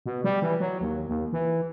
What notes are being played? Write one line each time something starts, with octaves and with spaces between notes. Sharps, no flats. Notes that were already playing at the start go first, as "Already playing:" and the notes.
B2
G3
E3
F#3
D#2
D#2
E3